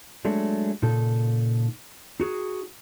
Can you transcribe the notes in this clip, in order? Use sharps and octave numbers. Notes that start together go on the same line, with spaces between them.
F#3 G#3 A3 D4
A#2 C#3 D#4 A4
D#4 F#4 G#4